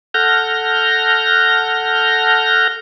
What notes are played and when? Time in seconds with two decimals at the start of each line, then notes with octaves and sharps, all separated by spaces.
0.14 A4 F#5 F6 G6 A#6